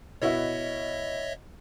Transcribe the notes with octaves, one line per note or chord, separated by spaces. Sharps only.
B2 E4 F#4 C#5 D#5 E5